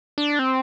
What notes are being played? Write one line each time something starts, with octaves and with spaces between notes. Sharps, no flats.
D4
C4